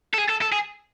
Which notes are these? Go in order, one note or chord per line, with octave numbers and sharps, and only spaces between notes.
A4
G#4
A4
A4
G#4